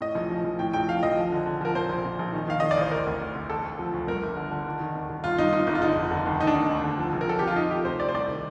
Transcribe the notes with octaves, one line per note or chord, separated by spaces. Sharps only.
A2 D#5
A#1
F3
A#1
A2 G5
A#1 G5
F3 F5
A#1 D#5
F3
D3
D3
F3 A#4
A#2 C5
A#1
A#2
A#1
D#3
D#3 F5
D#3 D#5
D5
A1 C5
D2 A#4
D2
D2
D2
D3 A4
D2
F3
D2
G2 A#4
G1
D3
D3
D#3
D#3
D#2
D#3
G1 F4
G2 D#4
G1 D#4
G1 D#4
F4
D3 D#4
F1
D3
D#2
D2 D#4
D4
D2 D#4
D2
D3
F3
A#1
A#4
F3 A4
F3 G4
F4
C3 D#4
C3 G4
D2 C5
C3 D5
C5
C2 D5
D#3